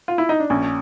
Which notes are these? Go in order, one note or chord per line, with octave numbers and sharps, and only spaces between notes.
F4
E4
D#4
D4
A#1 C#4